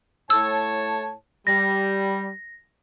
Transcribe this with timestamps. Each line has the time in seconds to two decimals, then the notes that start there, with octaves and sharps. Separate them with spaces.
0.30 A2 C#5 A5 E6
1.47 G3 A#6